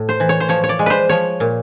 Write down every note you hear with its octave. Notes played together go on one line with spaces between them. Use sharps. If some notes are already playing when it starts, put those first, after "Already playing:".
Already playing: A2
C5
E3
C#5
C5
F3 C#5
C#5
D5
G#3
B4 C5
F3 C#5
A#2